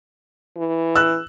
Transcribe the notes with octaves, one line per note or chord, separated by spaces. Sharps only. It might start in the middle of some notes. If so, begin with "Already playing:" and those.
E3
E6 F#6